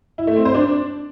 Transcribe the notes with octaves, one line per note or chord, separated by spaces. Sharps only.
E4
A3
C4
C5
D4